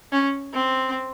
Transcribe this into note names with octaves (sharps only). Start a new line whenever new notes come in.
C#4
C4